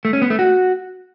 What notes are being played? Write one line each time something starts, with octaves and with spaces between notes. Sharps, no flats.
A3
C#4
B3
A3
F#4